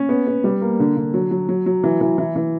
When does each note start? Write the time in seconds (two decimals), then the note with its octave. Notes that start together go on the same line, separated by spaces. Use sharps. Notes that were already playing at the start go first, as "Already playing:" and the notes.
Already playing: C#4
0.09 B3
0.27 B3
0.44 G3
0.61 A#3
0.79 D3
0.97 D3
1.14 F#3
1.31 F#3
1.49 F#3
1.66 F#3
1.84 E3
2.01 E3
2.18 E3
2.36 E3